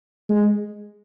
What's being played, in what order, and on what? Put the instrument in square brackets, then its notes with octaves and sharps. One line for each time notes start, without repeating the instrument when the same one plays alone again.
[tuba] G#3